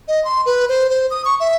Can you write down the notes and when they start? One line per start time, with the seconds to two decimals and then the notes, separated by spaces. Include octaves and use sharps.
0.08 D#5
0.25 C6
0.46 B4
0.69 C5
0.90 C5
1.11 D#6
1.25 C#6
1.40 E5